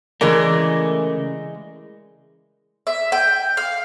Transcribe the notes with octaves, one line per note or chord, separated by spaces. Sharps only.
C#3 E3 G#3 A3 A#4 D5
E5
G5
F5